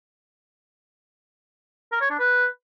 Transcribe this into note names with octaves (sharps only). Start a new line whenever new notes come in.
A#4
C#5
D4
B4